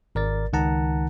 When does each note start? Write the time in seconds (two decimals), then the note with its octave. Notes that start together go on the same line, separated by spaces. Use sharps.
0.15 G#1 A#4 D5 A6
0.53 C#2 D#3 F#5 A5 A#5